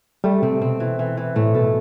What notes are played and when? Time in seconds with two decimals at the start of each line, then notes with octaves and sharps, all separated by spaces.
0.24 G3 A3
0.42 C3 C4
0.61 B2 C4
0.80 E3
0.99 E3
1.17 E3
1.36 A2 A3
1.55 B2 A4